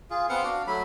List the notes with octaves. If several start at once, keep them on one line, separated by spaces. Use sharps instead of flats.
F4 G#4
B3 C4 F5 F#5
D4 F#4 F5
F#3 A3 B5